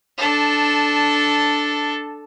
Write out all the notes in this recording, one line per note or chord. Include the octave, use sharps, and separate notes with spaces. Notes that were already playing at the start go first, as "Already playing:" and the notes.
D4 A4